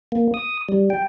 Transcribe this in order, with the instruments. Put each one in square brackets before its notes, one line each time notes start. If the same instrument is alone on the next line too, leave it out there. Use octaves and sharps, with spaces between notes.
[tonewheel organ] A#3
D#6
G3
G5